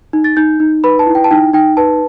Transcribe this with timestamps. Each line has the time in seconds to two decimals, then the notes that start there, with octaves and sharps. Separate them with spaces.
0.13 D#4
0.24 A6
0.37 D#4 G6
0.60 D#4
0.84 B4 B5
0.99 A5
1.07 E4
1.15 G5
1.24 A5
1.31 D#4 G5
1.53 D#4 G5
1.77 B4 A5